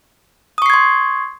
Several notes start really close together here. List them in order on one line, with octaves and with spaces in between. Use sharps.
D#6 C#6 C7 G#6 C6